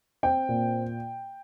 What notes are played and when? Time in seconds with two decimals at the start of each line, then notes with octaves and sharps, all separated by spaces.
0.23 C4 G5
0.49 A#2